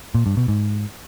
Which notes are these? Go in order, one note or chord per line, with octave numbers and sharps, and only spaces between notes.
A#2
G2
B2
G#2